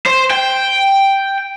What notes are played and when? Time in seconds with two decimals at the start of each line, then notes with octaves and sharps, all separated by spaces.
0.06 C5
0.30 G5